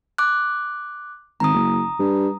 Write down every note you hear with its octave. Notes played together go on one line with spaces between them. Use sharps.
D6 F#6
G#1 A#5 D#6
F#1
G2